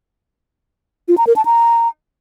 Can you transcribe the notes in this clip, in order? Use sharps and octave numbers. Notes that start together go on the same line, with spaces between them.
F4
A#5
A#4
A5
A#5